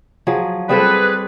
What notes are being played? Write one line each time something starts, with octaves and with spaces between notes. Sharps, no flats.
F3 F#3 G#4
G3 C4 G#4 A4 B4